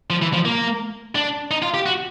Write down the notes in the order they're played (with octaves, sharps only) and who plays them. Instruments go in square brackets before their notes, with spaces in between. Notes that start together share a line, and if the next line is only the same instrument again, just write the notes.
[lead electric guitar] F3
E3
F3
A#3
D4
D#4
F4
G4
F#4